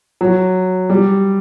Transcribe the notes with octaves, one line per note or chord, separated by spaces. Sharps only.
F#3
G3